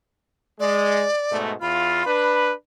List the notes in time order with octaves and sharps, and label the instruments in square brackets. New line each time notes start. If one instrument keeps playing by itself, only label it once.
[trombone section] G#3 [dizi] D5
[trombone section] G#2 B2 A3
[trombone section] E2 F4 [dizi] B5
[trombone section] D4 B4